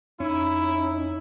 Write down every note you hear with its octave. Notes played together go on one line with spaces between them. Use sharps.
F2 C#4 D#4 E4